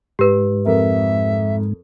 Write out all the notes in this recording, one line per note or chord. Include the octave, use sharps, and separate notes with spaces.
G#2 G4 B4
F2 A#4 E5